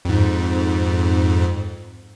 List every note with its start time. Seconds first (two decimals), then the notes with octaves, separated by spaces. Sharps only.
0.05 F2 G#2